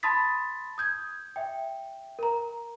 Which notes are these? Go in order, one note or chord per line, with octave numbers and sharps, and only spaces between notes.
A5 B5 C6 D#6 A6 B6
D#6 G6 G#6
E5 G5
A#4 A#5